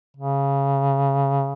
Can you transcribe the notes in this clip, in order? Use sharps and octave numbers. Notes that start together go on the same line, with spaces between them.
C#3